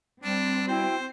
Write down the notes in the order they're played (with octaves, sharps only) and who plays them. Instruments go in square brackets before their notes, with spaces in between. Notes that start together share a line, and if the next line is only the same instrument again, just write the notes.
[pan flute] G3 [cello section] C4 [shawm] D4
[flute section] E4 F#4 G5 [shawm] C5